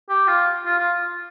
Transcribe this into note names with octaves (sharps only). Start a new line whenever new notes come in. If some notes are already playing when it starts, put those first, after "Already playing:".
G4
F4
F4
F4